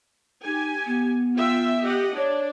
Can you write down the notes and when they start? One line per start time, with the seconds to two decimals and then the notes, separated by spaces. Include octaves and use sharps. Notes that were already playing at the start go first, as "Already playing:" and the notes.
0.44 D#4 G4 G#5
0.86 B3
1.36 F4 E5 G5
1.80 G4 D#5 F#5
2.16 D4 C#5